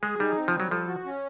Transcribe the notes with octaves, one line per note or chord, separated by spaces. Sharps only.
G#3 G#4
G3 D#4
C4
F3
G3
F#3
F3 A4
F#4
C#4